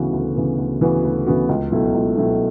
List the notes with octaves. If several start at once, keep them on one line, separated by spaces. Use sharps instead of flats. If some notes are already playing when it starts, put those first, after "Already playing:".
Already playing: D2 C#3 E3 B3 F#4
D2
C#3 E3 B3 F#4
D2
C#3 E3 B3 F#4
D2
C#3 E3 B3 F#4
C#2
B2 F#3 A3 E4
C#2
B2 F#3 A3 E4